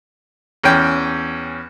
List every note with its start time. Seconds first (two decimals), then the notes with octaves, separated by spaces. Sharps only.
0.63 E2 C#4 G5